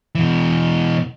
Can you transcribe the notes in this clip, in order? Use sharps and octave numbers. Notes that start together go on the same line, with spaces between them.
B2 E3